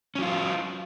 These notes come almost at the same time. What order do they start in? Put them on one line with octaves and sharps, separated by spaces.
C#4 F#3 F4